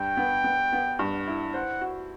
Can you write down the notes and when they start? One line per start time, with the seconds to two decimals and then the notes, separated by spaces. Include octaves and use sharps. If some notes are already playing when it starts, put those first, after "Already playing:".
Already playing: G2 G5
0.17 B3
0.44 B3
0.73 B3
0.99 G2
1.28 E4
1.54 C5 F#5
1.81 F#4